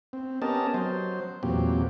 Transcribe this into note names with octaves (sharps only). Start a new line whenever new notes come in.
C4
B3 C#4 G4 A#4 D#5 A5
F#3 C5
E2 A#2 F#3 C4 G4